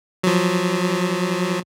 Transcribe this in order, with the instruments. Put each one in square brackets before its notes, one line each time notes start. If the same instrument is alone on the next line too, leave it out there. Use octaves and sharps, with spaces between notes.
[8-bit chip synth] F3 F#3